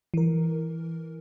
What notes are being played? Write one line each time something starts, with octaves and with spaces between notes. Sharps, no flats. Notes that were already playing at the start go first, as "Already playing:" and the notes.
E3 A#4